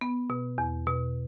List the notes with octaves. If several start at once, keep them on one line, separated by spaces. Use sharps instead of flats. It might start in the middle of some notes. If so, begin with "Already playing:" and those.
B3
B2
E2
B2